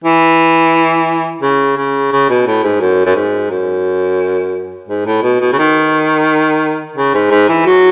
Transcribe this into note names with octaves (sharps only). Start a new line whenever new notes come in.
E3
C#3
C#3
C#3
B2
A2
G#2
F#2
F#2
G#2
F#2
G#2
A2
B2
B2
C#3
D#3
C#3
G#2
G#2
E3
F#3